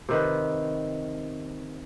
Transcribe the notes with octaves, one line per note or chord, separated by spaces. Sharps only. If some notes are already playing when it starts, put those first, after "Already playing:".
C3 D#3 B4